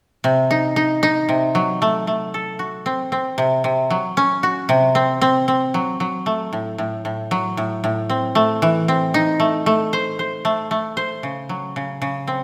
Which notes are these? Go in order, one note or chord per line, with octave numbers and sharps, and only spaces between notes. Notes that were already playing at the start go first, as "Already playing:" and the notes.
C3
D#4
D#4
D#4
C3
F#3
A3
A3
A4
F#4
C4
C4
C3
C3
F#3
C#4
F#4
C3
C4
C4
C4
F#3
F#3
A3
A2
A2
A2
F#3
A2
A2
C4
A3
E3
C4
D#4
A3
A3
C5
C5
A3
A3
C5
C#3
F#3
C#3
C#3
C4